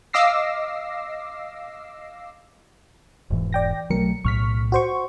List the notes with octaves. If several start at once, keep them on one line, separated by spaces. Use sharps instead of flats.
D#5 F5 D6 E6 A#6 C7
E1 G#2 E3
D5 G5 A#6
B1 F#3 G#3 A3 A#4 C#7
B1 A2 C#6 F6 B6
F#4 C5 C#6